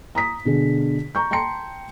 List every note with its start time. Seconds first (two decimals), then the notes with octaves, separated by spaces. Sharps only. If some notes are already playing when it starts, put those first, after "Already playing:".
0.15 A#5 D#6 B6
0.45 B2 D3 G#4
1.15 A#5 C#6 G6
1.31 G5 A5 A#5 C6 C#7